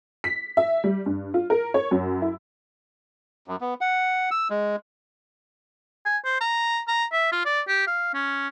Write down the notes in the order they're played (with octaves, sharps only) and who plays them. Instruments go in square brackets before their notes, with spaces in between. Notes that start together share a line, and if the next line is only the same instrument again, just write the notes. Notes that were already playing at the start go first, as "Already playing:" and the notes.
[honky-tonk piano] B6
E5
G3
G2
F4
A#4
C#5
F#2
E4
[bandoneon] F#2
B3
F#5
E6
G#3
[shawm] G#5
C5
A#5
A#5
E5
F4
D5
G4
F5
C#4